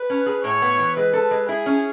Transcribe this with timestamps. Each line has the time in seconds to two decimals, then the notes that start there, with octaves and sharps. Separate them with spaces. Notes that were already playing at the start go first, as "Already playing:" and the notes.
Already playing: B4
0.10 C#4
0.26 G#4
0.44 A2 C#5
0.62 B3
0.79 E3
0.96 G#3 B4
1.13 A4
1.31 G#3
1.49 E4 G#4
1.66 C#4